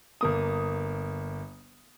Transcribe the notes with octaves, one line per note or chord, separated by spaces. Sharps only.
G1 A#3 D#6